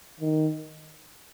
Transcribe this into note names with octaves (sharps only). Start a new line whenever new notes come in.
D#3